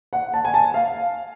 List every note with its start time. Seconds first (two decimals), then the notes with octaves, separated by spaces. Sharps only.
0.13 F#5
0.34 A5
0.45 G#5
0.54 A5
0.74 F5